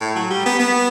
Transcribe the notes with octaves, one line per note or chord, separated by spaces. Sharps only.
A2
F#3
G3
B3
B3